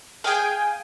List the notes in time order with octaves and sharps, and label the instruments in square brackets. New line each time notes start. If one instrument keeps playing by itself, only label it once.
[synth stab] G#4 G5 [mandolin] F5 G#5